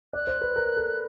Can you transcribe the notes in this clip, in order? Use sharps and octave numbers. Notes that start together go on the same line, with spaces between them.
D5 F#6
C5
B4
A#4
A4